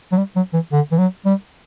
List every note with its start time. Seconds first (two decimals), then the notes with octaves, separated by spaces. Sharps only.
0.12 F#3
0.17 G3
0.36 F#3
0.53 E3
0.72 D3
0.91 E3
0.98 F#3
1.26 G3